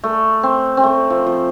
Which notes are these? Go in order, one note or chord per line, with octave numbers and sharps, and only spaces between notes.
A3
C4
C4
A3
F3
F3